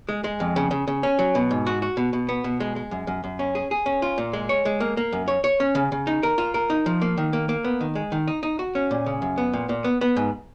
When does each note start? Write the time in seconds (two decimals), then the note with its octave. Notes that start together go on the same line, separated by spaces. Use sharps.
0.09 G#3
0.24 G#3
0.40 F2
0.56 C#3
0.71 C#3
0.88 C#3
1.03 C#4
1.19 F#3
1.35 B2
1.51 G#2
1.67 F#4
1.82 F#4
1.97 B2
2.13 B2
2.29 B3
2.44 B2
2.60 G#3
2.76 G#3
2.91 F#2
3.07 F#2
3.24 F#2
3.39 C#4
3.55 G#4
3.71 G#4
3.86 C#4
4.02 F4
4.18 A#2
4.33 G#3
4.49 C#5
4.65 G#3
4.80 A#3
4.97 A#3
5.12 F#2
5.28 C#5
5.44 C#5
5.60 C#4
5.75 C#3
5.92 C#3
6.07 D#4
6.23 A#4
6.38 F4
6.54 A#4
6.70 D#4
6.86 F3
7.02 A#3
7.18 D#3
7.33 A#3
7.49 A#3
7.64 B3
7.81 D#3
7.95 G#3
8.12 D#3
8.28 D#4
8.43 D#4
8.59 F#4
8.75 C#4
8.91 A#2
9.06 C#3
9.22 F#2
9.38 B3
9.53 A#2
9.69 A#2
9.84 B3
10.01 B3
10.17 G#2